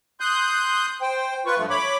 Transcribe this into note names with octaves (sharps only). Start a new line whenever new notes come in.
C6 D#6 F#6 G6
C5 G5
F4 B4 C#6
G2 F3 A3
C#5 B5 D6